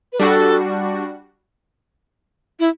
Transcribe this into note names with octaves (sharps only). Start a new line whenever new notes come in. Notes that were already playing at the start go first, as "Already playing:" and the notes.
B4
G3 D4 F#4 A4
E4